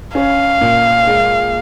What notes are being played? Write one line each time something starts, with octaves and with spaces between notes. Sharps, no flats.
C#4 F5
A#2
G#3